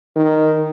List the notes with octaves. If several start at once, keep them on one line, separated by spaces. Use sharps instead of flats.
D#3